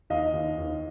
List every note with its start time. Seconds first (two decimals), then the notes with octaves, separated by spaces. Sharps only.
0.10 D#2 D#5 F5
0.34 D#2
0.58 D#2